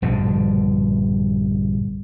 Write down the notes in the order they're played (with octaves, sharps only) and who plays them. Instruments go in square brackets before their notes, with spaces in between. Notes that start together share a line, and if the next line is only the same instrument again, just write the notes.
[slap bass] A#1 G2 B2 D3